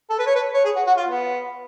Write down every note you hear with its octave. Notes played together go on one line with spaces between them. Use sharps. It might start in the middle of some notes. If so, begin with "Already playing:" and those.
A4
B4
C#5
B4
C#5
G#4
F#4
F#4
F4
B3